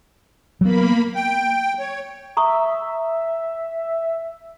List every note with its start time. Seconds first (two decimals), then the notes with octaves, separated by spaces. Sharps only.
0.61 F#3 A#3 B3 B5
1.15 G5
1.79 C#5
2.37 E5 A#5 C#6 D#6